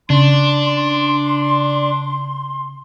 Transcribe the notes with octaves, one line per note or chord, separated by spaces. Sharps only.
C#3 D4 C6